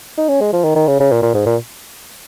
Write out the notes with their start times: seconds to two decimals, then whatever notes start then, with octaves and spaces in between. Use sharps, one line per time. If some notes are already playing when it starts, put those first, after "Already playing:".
0.18 D#4
0.29 C#4
0.41 G#3
0.53 F3
0.64 D#3
0.76 D#3
0.88 C#3
1.00 C#3
1.12 A#2
1.23 A#2
1.34 G#2
1.46 A#2